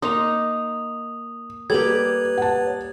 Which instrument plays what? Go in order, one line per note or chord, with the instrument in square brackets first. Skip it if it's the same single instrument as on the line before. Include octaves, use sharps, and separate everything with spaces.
[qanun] A#3 D#4 D#5 [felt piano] C6 [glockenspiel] D#6 F7
[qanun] G3 A#3 G4 [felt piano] A4 [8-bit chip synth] B4 C#5 [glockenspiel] G#6 F#7
[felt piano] F#5 A5